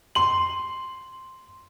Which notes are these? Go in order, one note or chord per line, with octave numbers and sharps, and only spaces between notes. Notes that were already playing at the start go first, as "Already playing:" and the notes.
C6 F#7